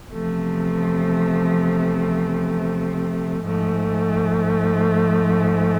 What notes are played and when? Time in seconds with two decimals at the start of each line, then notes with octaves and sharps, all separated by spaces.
0.12 E2 C3 F3 A3
3.41 G#2 F3 A3